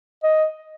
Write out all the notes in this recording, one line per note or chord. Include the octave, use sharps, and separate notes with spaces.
D#5